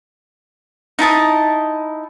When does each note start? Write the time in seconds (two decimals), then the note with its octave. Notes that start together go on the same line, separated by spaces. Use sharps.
0.99 D#4 E4 A5 D#6